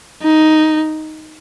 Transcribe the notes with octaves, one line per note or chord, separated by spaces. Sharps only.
D#4